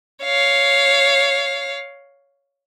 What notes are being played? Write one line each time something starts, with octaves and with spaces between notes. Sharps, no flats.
C#5 F5